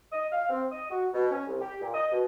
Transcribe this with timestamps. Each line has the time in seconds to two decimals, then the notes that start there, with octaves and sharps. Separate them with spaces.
0.13 D#5
0.33 F5
0.50 C4
0.70 D#5
0.90 F#4
1.13 B2
1.31 C#4
1.47 C2
1.60 G4
1.81 A#2
1.94 D#5
2.11 B2